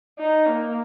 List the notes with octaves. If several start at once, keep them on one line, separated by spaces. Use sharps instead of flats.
D#4
A#3